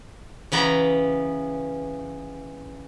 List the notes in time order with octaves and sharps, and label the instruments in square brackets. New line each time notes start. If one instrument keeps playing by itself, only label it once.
[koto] C#3 E3 B3 A#5